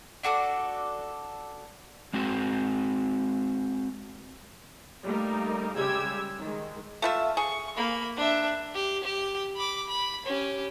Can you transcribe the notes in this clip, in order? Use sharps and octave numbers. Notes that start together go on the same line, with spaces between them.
D4 F#4 A4 D5
G#3 C4 F#4
G3 A3 A#3 D#4 A#4
C#3 G3 G#3 G4 E6 G#6
D#3 G#3
A3 F4 E5
G#4 C#6
A#3 B5
D4 E5
G4
G4
B5 D6
B5
C#4 G4